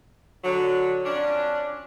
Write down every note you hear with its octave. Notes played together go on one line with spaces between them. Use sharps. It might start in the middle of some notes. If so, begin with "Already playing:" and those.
D3 F#3
F2 C#4 D4